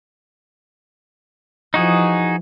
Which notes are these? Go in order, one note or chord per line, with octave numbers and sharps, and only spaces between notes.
E3 F3 D#4 F#4 G#4